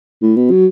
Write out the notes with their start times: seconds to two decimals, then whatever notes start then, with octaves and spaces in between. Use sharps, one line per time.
0.22 A2
0.37 B2
0.51 F#3